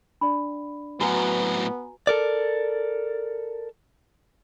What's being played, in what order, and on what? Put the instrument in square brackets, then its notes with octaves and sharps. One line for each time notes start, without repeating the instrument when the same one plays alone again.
[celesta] D4 D5 [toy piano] B5
[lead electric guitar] A2 F#3 [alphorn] B3 [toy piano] F#4 B4 F#5 [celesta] G#5 A#5
[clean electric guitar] A4 A#4 D5